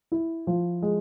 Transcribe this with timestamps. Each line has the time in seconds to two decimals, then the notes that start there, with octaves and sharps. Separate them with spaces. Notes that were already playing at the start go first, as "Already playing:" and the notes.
0.12 E4
0.47 F3
0.82 G#3